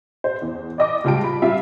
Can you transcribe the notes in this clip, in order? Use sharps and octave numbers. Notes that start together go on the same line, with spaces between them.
C5
E2
D5 D#5 D6
C#2 G3 F4 G5 A5 D7
B5
G3 F4 E5 F5